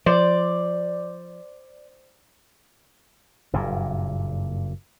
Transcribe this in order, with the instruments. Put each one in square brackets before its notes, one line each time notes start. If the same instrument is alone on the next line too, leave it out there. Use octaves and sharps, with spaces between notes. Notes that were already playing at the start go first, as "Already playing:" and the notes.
[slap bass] F3 [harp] C5 [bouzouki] D5
[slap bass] F#1 G2 A#2